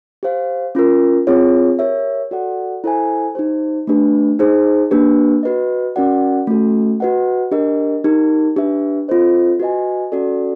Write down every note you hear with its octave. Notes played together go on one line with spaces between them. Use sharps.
G4 C5 F5
C#4 F4 A#4
C4 F4 G#4 C#5
G4 A#4 C#5 E5
F#4 A4 D5 F#5
E4 A4 C5 E5 G#5
D#4 G4 C5
A3 D4 G4 B4
D#4 G#4 C5
A#3 D4 G4 B4
F#4 B4 D#5
C#4 F#4 A#4 D5 F#5
A3 C#4 F#4 A4
F#4 B4 D#5 F#5
D4 G4 A#4 D#5
D#4 G4 A#4
D4 G4 B4 E5
C4 F4 A4 C5 D#5
F#4 B4 D#5 G#5
C#4 F#4 A4 D5